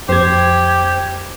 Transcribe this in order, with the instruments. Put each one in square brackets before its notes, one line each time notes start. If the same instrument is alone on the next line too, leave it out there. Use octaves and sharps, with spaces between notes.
[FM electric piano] F2 G#6 [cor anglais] G4 [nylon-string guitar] C5